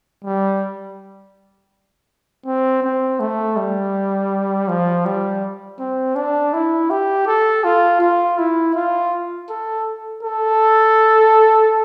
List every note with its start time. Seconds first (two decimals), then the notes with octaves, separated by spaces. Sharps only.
0.24 G3
2.46 C4
2.83 C4
3.20 A3
3.56 G3
4.68 F3
5.05 G3
5.79 C4
6.15 D4
6.53 E4
6.90 G4
7.27 A4
7.64 F4
8.01 F4
8.38 E4
8.75 F4
9.49 A4
10.23 A4